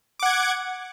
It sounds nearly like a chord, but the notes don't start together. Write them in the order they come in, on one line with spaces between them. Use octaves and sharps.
D6 F#5 G#6